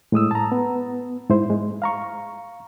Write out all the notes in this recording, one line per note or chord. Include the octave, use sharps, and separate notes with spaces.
A2 G#3 D#6 E6
A5 A#5
B3
G#2 E4 C5
G#3
F5 A#5 C#6